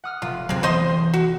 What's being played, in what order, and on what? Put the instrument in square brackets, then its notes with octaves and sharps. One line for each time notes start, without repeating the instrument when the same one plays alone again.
[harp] F#5 D#6 F6
[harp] F1 [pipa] F4
[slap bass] C3 F#3 [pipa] G#3 C4
[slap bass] D2 E3 B3 [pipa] C5 D#5 C6
[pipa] F#4